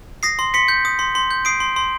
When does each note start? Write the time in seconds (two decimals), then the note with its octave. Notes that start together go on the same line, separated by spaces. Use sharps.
0.23 D#6 A#6 C7
0.39 C6
0.54 C6 B6 C#7
0.68 G6
0.85 D#6
0.99 C6
1.15 C6
1.31 G6
1.45 D#6 C7 D7
1.60 C6
1.76 C6